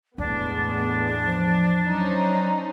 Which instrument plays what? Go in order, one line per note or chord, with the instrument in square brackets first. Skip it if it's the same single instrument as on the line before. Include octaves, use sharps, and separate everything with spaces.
[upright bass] E2 [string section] A2 G#3 B3 [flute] D4
[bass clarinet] F3
[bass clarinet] F#3 [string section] C#4 D#4 C5